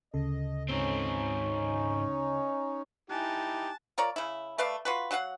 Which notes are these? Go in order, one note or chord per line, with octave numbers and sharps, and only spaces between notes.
D2 C#3 A4 D#5
G#2 C4 C#4 D#4
D#4 E4 G4 G#5 A5 F#6
F4 A#4 C#5 D5
C#3 E4
A3 B4 D5 F5
F4 F#4 B4
F#3 F#4 F5 F#5